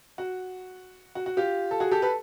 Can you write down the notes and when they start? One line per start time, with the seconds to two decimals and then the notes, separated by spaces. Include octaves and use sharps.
0.18 F#4
1.15 F#4
1.26 F#4
1.37 F4 G4
1.71 A4
1.80 F#4 G#4
1.92 G4 A4
2.02 A4 B4